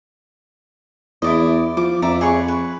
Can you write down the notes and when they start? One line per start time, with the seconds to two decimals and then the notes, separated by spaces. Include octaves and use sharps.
1.22 E2 E4 D5 D#5
1.77 F3 D6
2.02 F2 D5 E5 A#5
2.21 G#4 B4 C#5
2.48 B4